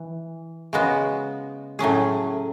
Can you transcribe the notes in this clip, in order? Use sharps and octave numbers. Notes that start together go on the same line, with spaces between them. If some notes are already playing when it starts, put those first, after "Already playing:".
Already playing: E3
C#3 G#3 B3 F#4
A2 F#3 C#4 G#4